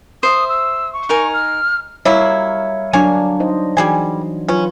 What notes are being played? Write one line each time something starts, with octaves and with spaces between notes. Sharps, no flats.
C5 E5 D#6
E6
C#6
D#4 A#4 G#5
F6
F#3 G3 A#3 E4 C#5 F5
F#3 A#3 D4 F#4 C#5 G#5
D#4 C5 D#5
E3 G3 F#4 G#4 G#5
F#3 C#4 F4 B4